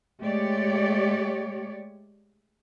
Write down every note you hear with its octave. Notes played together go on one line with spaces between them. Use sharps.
G#3 A3 G4 C#5 D5